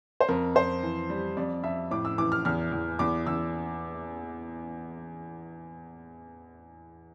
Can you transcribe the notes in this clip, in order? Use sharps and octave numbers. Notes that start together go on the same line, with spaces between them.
C5
F2 A#4
F2 C5
E3
G3
F2 D5
F2 E5
A2 D6
E6
E3 D6
F6
E2 F6
E2
E2 D6
E2 E6